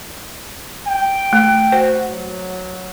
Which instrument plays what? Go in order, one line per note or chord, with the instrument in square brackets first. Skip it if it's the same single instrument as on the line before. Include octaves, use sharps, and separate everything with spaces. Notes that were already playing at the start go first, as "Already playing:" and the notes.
[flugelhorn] G5
[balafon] A3
[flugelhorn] F#4 [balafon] C5
[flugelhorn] F#3